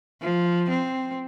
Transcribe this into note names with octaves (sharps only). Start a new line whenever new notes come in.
F3
C4